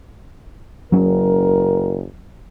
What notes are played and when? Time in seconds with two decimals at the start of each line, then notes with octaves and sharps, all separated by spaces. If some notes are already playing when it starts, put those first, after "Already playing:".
0.92 F#1 F#3 C#4 A#4